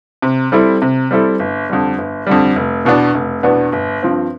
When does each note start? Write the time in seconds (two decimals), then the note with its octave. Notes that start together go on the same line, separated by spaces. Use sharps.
0.22 C3
0.52 G3 C4 E4 A4
0.82 C3
1.11 G3 C4 E4 A4
1.39 G1
1.69 F2 D3 G3
1.98 G1
2.27 F2 D3 G3
2.56 F1
2.85 E2 B2 B3 D4
3.14 F1
3.43 E2 B2 B3 D4
3.72 G1
4.03 G2 F3 C4